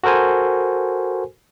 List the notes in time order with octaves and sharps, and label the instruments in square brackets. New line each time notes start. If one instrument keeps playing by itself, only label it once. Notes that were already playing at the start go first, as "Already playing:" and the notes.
[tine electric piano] F#4 A4 A#4 C5 G#5